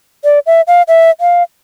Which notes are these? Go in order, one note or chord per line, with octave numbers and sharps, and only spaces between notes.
D5
E5
F5
E5
F5